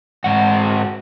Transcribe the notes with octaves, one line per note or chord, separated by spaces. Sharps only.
G#2 F#4